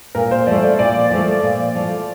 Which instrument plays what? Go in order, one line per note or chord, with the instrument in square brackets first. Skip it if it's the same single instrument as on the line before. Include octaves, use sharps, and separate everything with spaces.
[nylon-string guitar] A#2 [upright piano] A#4
[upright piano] C5
[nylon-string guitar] F3 A3 [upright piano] D5
[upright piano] D5
[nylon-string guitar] A#2 [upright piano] D5
[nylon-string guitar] F3 A3
A#2
F3 A3